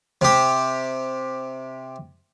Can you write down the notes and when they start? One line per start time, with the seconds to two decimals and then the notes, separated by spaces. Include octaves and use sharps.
0.21 C3 G4